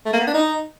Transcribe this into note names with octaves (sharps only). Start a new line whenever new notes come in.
A3
A#3
B3
D4
D#4